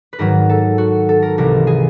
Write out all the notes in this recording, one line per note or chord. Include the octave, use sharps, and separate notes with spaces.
B4
G#2 D#3 F#3 A#4
A4
F#4
A4
A#4
C2 C3 E3 A#4
G#4